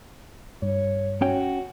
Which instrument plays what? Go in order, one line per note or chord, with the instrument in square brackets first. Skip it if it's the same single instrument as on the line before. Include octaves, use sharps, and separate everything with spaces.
[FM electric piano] G2 [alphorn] C#5
[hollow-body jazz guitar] C#4 G5 [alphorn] F#4